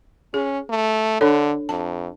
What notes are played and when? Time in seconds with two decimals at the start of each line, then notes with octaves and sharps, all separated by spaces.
0.34 C#4 G#4
0.70 A3
1.21 D3 D4 A4 C#5
1.69 F2 A5